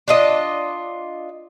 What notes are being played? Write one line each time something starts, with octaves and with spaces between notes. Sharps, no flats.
D4 F4 D#5